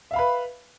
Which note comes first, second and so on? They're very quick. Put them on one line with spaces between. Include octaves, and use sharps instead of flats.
E5 F5 B5 B4